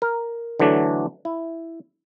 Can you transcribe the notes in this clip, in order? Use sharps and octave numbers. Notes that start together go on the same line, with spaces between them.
A#4
D3 E3 F#3 A3 D4
E4